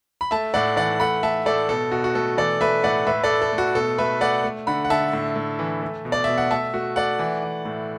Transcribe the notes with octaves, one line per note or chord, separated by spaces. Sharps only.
B5
A3 E5 A5
A2 D5 F#5
E3 D5 F#5
A3 F#5 B5
A3 E5 A5
A2 A4 D5
B2 A4
B2 F#4
F#4
A3 A4
E3 A4 D5
A3 B4 E5
A2 D5 F#5
A2 B4 E5
A4 D5
A3
A4
A3
F#4
B2 A4
A3 B4 E5
A3 D5 F#5
A3
D3 F#5 B5
F#5
D3 E5 A5
A2
A2
E3
A3
B2
D5
B2 E5
F#5
A3 E5 A5
A3 F#4
A3 D5 F#5
E3
E3
A2